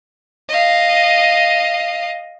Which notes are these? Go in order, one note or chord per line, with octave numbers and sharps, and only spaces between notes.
D#5 F5